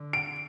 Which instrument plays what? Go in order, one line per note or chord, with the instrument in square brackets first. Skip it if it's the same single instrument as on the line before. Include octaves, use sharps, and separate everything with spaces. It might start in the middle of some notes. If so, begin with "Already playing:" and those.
Already playing: [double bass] D3
[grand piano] D7